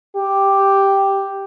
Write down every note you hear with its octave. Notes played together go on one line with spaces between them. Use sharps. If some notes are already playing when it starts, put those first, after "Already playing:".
G4